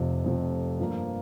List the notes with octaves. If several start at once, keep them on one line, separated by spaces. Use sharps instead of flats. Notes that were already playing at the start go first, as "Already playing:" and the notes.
Already playing: F1 F2 C3 F3
F1 F2 C3 F3
G2 F3 A#3